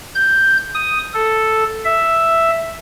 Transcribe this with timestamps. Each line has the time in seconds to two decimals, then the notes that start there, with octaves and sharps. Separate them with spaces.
0.15 G6
0.75 D#6
1.14 A4
1.84 E5